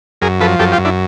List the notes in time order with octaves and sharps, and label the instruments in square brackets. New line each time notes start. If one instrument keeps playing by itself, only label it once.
[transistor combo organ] F#2 G#4 A#4
F3 A4 B4
F#2 G4 A4
F4 G4
F#2
D4 E4